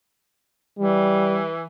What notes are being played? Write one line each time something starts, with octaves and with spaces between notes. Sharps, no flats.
E3 G3